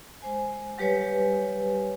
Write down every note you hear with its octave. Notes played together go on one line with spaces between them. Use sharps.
G#3 C5 G#5
F#3 G3 G4 B4 C#5 G#5